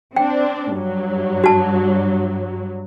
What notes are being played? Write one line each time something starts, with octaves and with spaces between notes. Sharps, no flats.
C4 D4 G5
G2 F#3
F#4 A5